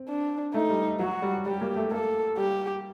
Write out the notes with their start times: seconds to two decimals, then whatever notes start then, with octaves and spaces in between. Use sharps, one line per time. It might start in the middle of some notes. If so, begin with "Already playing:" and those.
Already playing: C4
0.09 D4
0.54 A3 D#4
0.69 G3
0.99 F#3 F#4
1.22 G3
1.46 G3 G4
1.61 A#3
1.76 A3
1.91 A#3 A4
2.37 G3 G4